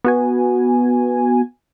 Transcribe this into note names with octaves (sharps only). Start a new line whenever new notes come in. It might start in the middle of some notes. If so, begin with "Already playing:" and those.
B3 F#4 G#5